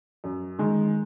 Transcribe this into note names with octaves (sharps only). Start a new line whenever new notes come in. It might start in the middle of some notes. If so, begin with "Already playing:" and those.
F#2
D#3 G#3